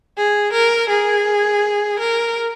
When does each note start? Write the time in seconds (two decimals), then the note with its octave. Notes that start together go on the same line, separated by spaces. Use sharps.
0.18 G#4
0.53 A#4
0.90 G#4
1.99 A#4